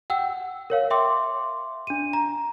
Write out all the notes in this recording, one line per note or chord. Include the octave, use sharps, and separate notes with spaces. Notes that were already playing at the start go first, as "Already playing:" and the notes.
F#5 G5 E6
A#4 C#5 F5
E5 G5 C6 D6
D4 D#7
A#5